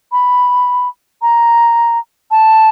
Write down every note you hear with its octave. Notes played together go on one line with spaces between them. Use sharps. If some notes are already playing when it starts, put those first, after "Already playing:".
B5
A#5
A5